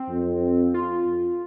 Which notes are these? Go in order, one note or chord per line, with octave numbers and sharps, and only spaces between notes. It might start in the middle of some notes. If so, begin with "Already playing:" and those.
Already playing: C4
F2
F4
F2